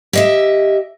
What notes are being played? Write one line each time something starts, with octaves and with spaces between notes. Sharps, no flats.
G4 D#5 E5